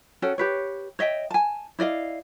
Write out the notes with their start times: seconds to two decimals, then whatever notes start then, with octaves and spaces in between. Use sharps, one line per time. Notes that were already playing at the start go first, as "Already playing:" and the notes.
0.22 C#4 F#4 A4 G5
0.38 G4 B4 C#5
0.99 C#5 D#5 E5 G5
1.31 G#5 A5
1.79 E4 D5 D#5 F5